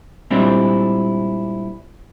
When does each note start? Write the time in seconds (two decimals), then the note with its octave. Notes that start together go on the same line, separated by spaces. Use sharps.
0.31 A#2 G3 G#3 C4 D4 E4